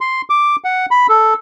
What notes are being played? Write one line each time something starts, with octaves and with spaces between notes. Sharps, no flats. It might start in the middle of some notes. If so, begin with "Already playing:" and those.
C6
D6
F#5
B5
A4